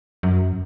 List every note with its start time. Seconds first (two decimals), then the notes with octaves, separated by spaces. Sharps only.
0.23 F#2